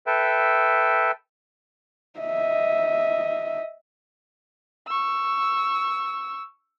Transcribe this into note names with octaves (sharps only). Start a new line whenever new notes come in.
A4 B4 E5 G5
D#5 E5
C#6 E6